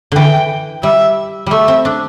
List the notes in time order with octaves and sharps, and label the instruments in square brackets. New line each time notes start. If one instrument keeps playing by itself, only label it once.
[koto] D3 E3 [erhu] G5
[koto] G3 [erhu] E5
[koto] G3 A3 [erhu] E5
[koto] C4
D4